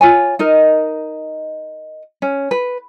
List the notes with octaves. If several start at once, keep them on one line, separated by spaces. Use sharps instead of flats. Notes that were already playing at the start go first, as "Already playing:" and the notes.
F4 C#5 G#5
D#4 A#4 D#5
C#4
B4